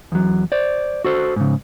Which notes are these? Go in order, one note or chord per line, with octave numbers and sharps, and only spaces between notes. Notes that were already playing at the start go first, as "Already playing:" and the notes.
E2 F#3
C5 D5
F#4 A4 C5
G#2 C#3